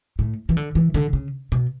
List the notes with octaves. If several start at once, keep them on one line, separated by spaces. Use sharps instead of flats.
A2
E3
D3
E3
D3
C#3
B2